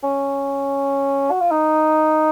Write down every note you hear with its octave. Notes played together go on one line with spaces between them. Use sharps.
C#4
F#4
F4
D#4